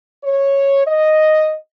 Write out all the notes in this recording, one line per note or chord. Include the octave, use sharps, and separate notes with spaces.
C#5
D#5